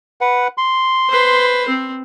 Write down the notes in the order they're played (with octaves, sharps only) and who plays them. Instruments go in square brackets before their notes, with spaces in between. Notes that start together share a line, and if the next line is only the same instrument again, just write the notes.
[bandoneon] B4 F#5
C6
[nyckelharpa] B4 C5
C4